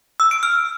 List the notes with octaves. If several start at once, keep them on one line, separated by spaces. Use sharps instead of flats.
E6
D7
F6